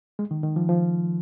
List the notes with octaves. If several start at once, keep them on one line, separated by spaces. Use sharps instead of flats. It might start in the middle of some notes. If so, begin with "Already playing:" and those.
G#3
D#3
D#3
F3
F3